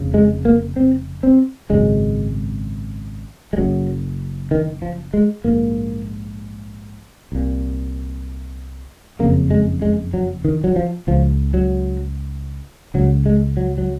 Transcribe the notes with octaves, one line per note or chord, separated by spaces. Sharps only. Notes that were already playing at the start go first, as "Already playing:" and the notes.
Already playing: F1 F2 C#3
G#3
A#3
C4
C4
G#1 F#2 C#3 G#3
G#3
F#1 F#2 C#3 F#3
D#3
F3
G#3
A#1 G#2 A#3
C2 A#2
F#1 F2 C#3 A#3
G#3
G#3
F#3
D#3
F#3
F3
C#2 C#3 F3
F#3
C#2 C#3 F#3
G#3
F#3
F#3